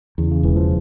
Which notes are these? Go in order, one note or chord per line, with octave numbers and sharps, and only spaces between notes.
E2 C#3
C#3
E1 E3
F3